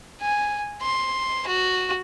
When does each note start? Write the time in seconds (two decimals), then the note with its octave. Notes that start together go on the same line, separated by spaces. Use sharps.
0.21 G#5
0.82 C6
1.47 F#4